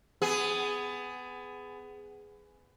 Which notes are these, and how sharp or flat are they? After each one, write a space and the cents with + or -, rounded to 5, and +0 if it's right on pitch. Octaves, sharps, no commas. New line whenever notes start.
B3 +25 G#4 +0